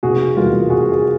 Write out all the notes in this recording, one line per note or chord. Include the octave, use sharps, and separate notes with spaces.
F1 F#4 G#4
E2 B2 G3 A#3 F4
F1 F#4 G#4
G#4